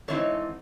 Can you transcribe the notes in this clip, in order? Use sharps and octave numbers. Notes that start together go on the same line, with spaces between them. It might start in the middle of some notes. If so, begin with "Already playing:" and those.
G#2 E3 C4 D#4 A4 C#5